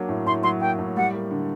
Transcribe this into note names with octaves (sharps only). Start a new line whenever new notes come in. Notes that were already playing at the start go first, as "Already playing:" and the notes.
Already playing: F#3 A#3 D4
A2
A2 C6
F#3 C6
A#3 G5
A2
G3 F#5
A#3
D3